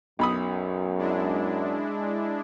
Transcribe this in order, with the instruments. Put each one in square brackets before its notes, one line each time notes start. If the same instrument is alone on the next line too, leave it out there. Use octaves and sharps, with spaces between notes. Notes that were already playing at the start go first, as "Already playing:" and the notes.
[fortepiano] B1 B5 D#6 [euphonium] F#2
[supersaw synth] G#3 D4 E4